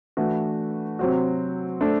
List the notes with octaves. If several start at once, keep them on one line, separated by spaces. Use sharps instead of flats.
E3 A3 D4 F#4 B4
C3 F#3 C4 F#4
A3 D4 A4 C5